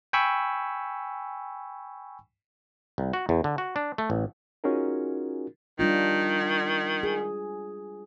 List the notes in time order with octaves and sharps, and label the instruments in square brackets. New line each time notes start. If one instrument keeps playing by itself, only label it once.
[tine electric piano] G5 G#5 B5 C#6 E6
[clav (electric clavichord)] C2
F#4
E2
D3
F#4
D4
A3
A1
[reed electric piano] C#4 D#4 F4 F#4 G#4 A#4
[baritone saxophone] D#3 [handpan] G3 D4 F4
[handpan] G#4